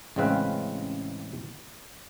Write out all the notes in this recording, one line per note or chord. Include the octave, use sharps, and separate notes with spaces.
A1 C#3 G#3 C4 B4 F5